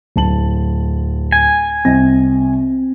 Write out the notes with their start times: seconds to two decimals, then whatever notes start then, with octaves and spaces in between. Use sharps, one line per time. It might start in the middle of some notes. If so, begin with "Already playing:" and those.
0.16 D1 A5 F#7
1.32 G#5
1.85 C2 C4 D#5 A#6